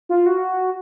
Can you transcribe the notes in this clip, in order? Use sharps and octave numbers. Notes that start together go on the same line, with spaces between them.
F4
F#4